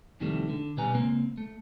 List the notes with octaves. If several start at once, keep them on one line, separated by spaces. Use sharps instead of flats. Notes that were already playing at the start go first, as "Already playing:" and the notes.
F2 C3 D#3 E3 G3 A3
D3
B2 G3 B4 G#5 A#5
C#2 A#3 C4
A3